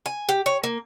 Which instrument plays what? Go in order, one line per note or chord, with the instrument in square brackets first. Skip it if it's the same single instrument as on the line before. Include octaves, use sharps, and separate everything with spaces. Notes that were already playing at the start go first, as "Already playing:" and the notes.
[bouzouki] G#5
G4
C#5
A#3